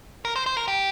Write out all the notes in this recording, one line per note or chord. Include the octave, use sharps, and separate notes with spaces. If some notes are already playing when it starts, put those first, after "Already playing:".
A#4
C5
C5
A#4
G4